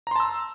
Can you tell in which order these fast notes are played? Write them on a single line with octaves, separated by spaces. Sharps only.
A#5 C6 A5 E6